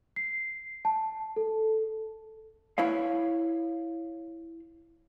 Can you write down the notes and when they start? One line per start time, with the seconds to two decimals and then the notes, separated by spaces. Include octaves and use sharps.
0.16 C7
0.85 A5
1.36 A4
2.78 E4 B4 C#5 F5